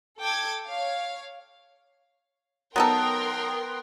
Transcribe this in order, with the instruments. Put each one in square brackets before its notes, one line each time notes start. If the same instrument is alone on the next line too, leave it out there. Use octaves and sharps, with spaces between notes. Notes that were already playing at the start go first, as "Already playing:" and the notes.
[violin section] A4 G5 D6 G#6
C#5 F5
[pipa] F#3 D#4 A4 [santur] B3 [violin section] A#4 G5 C6